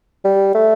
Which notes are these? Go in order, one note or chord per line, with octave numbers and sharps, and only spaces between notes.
G3
A3